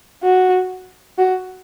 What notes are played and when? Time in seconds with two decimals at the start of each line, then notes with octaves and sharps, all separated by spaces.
0.24 F#4
1.18 F#4